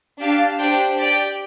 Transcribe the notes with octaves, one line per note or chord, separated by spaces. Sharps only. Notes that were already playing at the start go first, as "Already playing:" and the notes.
D4 G4 F5 A5
D4 G4 C5 G5
G4 D5 G5